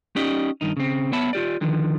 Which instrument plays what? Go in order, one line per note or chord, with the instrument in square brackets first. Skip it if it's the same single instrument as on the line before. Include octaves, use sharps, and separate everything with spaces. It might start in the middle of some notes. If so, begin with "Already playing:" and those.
[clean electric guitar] C#4 D#4 G4 D5 D#5
G2 D#3 D#4
C#3 C4
B3 C#5 E5 A5 B5
F4 G4 D5
D3 D#3 F3